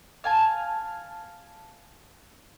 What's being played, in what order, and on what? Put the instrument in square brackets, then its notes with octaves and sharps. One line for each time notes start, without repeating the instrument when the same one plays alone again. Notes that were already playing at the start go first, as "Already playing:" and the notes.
[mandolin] F5 G#5 A5